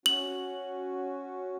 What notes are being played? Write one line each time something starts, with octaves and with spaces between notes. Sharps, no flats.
C#4 F#4 F#7